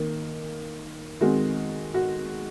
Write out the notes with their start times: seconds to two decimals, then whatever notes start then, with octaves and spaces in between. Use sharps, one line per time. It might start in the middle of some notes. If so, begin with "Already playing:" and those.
Already playing: D#3 A#3
1.20 D#3 G#3 C4 F#4
1.94 F#4